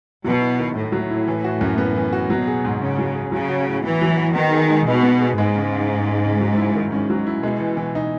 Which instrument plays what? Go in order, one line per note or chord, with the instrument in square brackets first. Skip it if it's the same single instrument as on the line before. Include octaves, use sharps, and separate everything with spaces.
[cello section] B2 [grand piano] F#3
[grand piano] E4
D#3
[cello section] A2 [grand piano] A3
[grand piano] F#3
E4
E3
F#4
F#2
B3
E3
F#4
[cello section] B2 [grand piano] F#3
[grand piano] G#4
G#2
[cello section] C#3 [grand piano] C#4
[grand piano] F#3
G#4
[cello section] C#3 [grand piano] F#3
[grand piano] F#4
A2
[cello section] E3 [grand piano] B3
[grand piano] F#3
F#4
[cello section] D#3 [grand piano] B3
[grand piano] G#4
G#3
[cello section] B2 [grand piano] D#4
[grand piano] B3
G#4
[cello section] G#2 [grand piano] G#3
[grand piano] C#3
C#3
D#4
G#3
C#3
F#3
E4
D#3
[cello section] G#2 [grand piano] C#4
[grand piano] F#3
E4
[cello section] B2 [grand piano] G#3
[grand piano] E3
E3
D#4